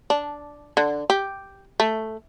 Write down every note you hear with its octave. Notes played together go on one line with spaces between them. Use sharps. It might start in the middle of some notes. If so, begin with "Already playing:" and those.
D4
D3
G4
A3